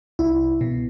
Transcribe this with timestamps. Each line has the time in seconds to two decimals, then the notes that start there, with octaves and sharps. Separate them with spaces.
0.19 C2 E4
0.61 B2